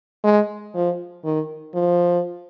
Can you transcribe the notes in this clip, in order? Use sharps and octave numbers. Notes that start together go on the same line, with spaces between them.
G#3
F3
D#3
F3